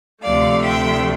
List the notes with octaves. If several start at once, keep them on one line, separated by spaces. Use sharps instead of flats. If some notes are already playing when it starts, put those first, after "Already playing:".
D2 C3 F3 A3 D5 F5
E5 G5